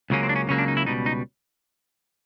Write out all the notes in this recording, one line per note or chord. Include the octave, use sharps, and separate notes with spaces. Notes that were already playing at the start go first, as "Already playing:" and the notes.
C#2 C#3 F#3 A#3 C#4
C4
D4
C#4
C#2 C#3 F#3 A#3 C#4
D4
D#4
E4
C#2 B2 G3 D#4
D#4